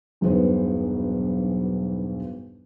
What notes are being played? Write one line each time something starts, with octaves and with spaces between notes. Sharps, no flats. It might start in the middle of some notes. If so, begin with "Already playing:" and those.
E1 B1 G2 B3 D#4 C5